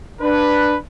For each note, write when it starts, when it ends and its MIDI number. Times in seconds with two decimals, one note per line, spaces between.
0.21 0.76 62
0.21 0.76 71